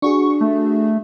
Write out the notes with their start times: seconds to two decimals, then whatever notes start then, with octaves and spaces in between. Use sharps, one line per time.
0.02 D4 F#4 G#4 C#6
0.41 A3